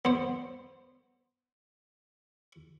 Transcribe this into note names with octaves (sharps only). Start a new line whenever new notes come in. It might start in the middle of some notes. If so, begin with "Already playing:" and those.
B3 C5